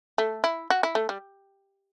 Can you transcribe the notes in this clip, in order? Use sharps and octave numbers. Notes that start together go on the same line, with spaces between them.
A3
E4
F#4
E4
A3
G3